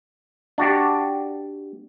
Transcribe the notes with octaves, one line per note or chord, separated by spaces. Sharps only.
D4 F#4 G4